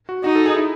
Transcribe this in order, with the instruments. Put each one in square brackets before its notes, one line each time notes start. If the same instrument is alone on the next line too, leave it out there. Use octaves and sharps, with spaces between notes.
[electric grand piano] F#4
[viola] D#4 [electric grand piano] F#4
[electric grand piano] A4
G#4
E4